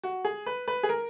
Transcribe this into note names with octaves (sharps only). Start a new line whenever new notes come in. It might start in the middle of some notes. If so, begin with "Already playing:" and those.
F#4
G#4
B4
B4
G#4
A#4